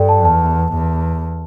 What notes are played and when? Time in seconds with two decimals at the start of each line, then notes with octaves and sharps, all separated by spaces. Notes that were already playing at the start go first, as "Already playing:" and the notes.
Already playing: G2 A4 D5 G5
0.09 A5
0.25 E2 A5
0.73 E2